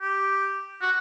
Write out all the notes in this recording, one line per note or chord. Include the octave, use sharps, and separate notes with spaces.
G4
F#4